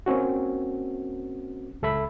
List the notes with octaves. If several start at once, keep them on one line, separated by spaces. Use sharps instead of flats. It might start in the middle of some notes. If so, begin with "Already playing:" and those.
A#3 C4 C#4 F#4
C#2 A4 E5 B5